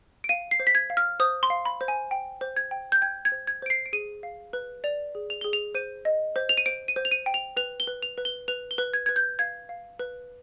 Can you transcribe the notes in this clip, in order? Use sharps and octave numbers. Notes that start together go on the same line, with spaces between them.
D7
F5 D#7
C7
C5
B6
G#6
F5
F6
C5 D#6
C6
F5
B5
C5
G#5
G5
C5
G#6
G5
G6
G5 G#6
G#6
C5
G#6
C5 D7
C7
D7
G#4 D#7
F5
B4
D5 F7
G#4
F7
G#4 G7
F7
C5 D#7
D#5
C5
F7
D#7
C5 D7
D#7
C5
F7
D#7
G5
F7
B4 F7
G7
B4
F7
B4
G7
B4 F7
G7
B4
G#6
B4 G#6
G6
F5 G#6
F5
B4